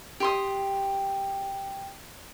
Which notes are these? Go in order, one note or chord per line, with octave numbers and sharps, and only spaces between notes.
G4 C6 D#6